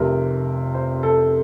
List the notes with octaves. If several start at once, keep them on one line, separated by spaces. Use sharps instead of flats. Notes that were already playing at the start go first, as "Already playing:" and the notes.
Already playing: F1 F2 C3 A#4
C5
A4